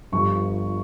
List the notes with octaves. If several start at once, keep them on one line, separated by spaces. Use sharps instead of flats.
G1 G2 F3 C#6